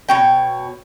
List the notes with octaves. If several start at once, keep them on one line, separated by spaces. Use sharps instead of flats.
B2 C#5 G5